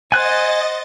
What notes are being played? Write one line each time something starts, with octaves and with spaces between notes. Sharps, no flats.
C5 D#5 F#5 G#5 F#6 A6